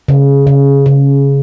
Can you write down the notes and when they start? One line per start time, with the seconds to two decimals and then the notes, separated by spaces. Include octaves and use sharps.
0.08 C#3
0.47 C#3
0.86 C#3